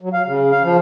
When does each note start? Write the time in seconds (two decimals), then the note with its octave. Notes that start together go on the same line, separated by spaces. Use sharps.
0.01 F#3
0.13 F5
0.27 C#3
0.52 F5
0.63 F3